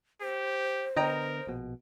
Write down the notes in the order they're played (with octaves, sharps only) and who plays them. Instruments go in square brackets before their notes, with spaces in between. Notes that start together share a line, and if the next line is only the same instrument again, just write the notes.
[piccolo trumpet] G4 [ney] C5
[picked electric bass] D3 B3 [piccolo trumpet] A#4 [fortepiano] D#5 G5 A#5
[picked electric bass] A#1 B2